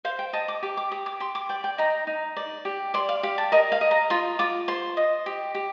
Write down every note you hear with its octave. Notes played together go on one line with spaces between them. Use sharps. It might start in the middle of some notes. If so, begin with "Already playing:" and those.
C5 F5
G5
D#5 A5
D6
G4 D6
D6
G4 D#6
D6
G4 C6
D6
D5 G5
G5
D#4 A#5
D#4
D5
G4
D5 C6
F5
G4 F5
A5
A#4 D#5
F5
D#5
A#5
F4 C6
F4 D6
C5 C6
D#5
G4
G4